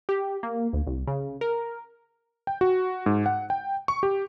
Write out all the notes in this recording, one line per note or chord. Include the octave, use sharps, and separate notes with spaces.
G4
A#3
D2
C2
C#3
A#4
G5
F#4
G#2
F#5
G5
C#6
G4